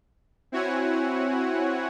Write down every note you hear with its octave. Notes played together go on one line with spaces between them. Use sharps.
C4 E4 F#4 C#5 F#5 G#5